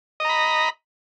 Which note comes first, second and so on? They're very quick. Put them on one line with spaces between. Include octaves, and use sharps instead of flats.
D#5 A#5 B5